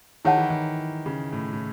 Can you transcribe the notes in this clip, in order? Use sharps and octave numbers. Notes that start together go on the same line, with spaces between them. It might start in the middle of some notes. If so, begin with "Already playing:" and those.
D#3 E4 G#4 C#5 F#5 A5
E3
D#3
C#3
A2
A2